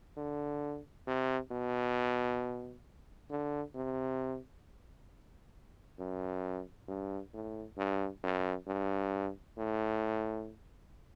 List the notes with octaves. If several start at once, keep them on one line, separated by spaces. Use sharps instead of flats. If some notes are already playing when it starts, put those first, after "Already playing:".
D3
C3
B2
D3
C3
F#2
G2
A2
G2
F#2
G2
A2